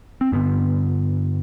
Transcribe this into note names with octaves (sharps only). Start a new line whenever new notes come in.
C4
G2 D3 B3